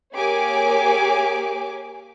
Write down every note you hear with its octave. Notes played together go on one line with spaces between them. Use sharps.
A#3 G4 G#4 C#5 G#5 D6